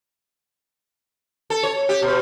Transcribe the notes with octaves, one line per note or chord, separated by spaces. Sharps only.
A4
C#5
G4
B2